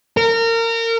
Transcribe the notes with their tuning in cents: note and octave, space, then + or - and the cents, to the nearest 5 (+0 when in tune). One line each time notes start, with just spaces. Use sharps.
A#4 -25